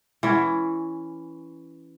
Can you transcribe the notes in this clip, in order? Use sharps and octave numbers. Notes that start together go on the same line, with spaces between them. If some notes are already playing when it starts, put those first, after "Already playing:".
E3 C#4